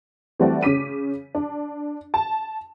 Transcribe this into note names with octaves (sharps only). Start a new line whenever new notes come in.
E3 G3 A3 C4 F#4 D5
C#3 C#4 D6 B6 D#7
D4
A5